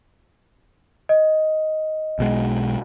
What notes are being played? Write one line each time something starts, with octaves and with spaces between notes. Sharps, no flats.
D#5
B1 B2 G#3